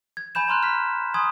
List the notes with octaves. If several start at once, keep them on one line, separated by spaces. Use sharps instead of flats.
G#6
G#5 B5 G6 E7
G#5 A#5 C6 F6 F#6
F6 B6
G#5 B5 C6 D#6 G#6